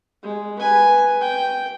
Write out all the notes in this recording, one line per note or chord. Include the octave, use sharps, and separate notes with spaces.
G#3
B4 G#5
G5